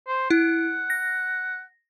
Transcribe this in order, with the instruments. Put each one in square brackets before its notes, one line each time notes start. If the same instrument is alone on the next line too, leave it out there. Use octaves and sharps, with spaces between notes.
[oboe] C5
[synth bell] E4 [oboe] F#5
[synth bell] A#6